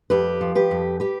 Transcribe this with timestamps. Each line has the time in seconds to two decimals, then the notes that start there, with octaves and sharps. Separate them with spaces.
0.10 F2 G4 B4
0.41 F3
0.55 G4 B4
0.71 F2
1.00 G4 B4